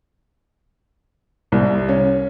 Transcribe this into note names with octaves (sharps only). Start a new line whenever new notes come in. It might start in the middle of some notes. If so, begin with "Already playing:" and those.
C2
C#4